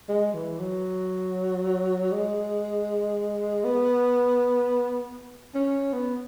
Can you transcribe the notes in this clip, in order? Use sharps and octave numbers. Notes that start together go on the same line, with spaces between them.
G#3
E3
F#3
G#3
B3
C#4
B3